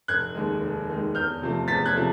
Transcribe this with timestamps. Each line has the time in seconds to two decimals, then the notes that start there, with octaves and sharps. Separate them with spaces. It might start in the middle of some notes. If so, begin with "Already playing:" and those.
0.08 F1 F#6 G#6
0.34 D#2 D#3 G#3
0.61 F1
0.89 D#2 D#3 G#3
1.15 E2 F6 G6
1.41 C3 F3 A3
1.68 E2 A6 B6
1.85 F#6 G#6
1.94 C3 F3 A3